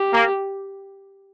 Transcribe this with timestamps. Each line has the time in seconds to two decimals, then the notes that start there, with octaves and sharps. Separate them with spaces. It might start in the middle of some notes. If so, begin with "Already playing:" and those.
Already playing: G4
0.13 A#3